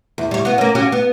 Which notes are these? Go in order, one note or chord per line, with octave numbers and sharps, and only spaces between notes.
E2
G3 C#5
B3 F#4
A#3 C#4
C#4 F#4 G4
B3